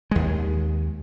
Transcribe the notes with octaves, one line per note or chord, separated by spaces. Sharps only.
D#2 G#3